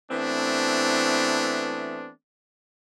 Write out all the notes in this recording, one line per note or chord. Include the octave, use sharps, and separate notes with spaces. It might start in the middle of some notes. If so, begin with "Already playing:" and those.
E3 A3 B3 C4 D4